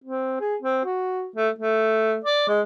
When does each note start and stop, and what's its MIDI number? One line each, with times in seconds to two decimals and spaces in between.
0.04 0.37 60
0.40 0.56 68
0.62 0.83 60
0.85 1.27 66
1.36 1.49 57
1.58 2.18 57
2.24 2.48 74
2.48 2.61 56